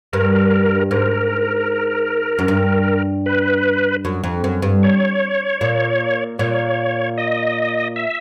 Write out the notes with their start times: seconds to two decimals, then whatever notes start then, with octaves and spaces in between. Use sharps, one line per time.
0.13 G2 A#4
0.91 G#2 A#4
2.39 F#2
2.48 G2
3.26 B4
4.05 F#2
4.24 F2
4.44 F#2
4.62 G2
4.83 C#5
5.61 A#2
6.39 A#2 C#5
7.18 D#5
7.96 E5